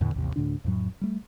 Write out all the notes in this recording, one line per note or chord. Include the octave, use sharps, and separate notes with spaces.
E2 A2 D3
A1 D#2 C3
D2 A2 D3 D4
F2 A2 F#3
G3 A3